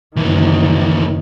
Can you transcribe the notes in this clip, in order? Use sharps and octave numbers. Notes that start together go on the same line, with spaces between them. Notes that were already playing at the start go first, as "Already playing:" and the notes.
F#1 D2 D#3 E3